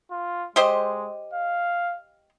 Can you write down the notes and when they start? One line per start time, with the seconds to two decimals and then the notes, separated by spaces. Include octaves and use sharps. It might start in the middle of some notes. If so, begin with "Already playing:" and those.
0.11 F4
0.56 G#3 G4 C5 D#5
1.33 F5